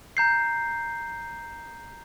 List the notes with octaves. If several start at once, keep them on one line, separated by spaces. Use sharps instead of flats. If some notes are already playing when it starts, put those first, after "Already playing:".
A#5 G6 C7